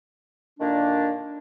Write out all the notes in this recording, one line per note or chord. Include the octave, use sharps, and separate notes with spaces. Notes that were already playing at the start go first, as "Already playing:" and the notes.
A#2 D3 D#3 A#3 D4